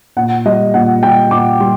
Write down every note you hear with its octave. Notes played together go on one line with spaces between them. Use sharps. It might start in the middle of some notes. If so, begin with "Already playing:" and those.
A#2 F#5
G3 D#5
A#2 F#5
G3 G5
A#2 D6
G3 C6